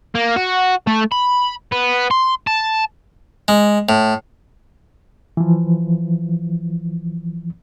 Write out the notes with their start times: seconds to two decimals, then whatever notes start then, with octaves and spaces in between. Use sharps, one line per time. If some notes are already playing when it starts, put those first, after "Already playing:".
0.15 A#3
0.36 F#4
0.87 A3
1.12 B5
1.72 B3
2.11 C6
2.47 A5
3.48 G#3
3.89 A2
5.37 E3 F3